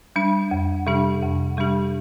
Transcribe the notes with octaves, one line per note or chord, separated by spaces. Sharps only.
G3 D4
F2
C3 G3 D4 G4
F2
C3 G3 D4 G4